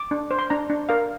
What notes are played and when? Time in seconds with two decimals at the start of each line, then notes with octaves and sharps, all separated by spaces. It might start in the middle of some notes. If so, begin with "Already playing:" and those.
Already playing: D6
0.11 D4
0.31 C5
0.39 C6
0.50 D4 A#5
0.70 D4
0.89 A#4 F5